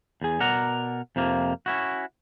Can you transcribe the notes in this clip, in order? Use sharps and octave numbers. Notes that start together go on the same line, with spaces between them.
E2 G#4
B2 A#4 D5 F#5 A#5
F2 C3 F3 A#3
C#4 E4 F#4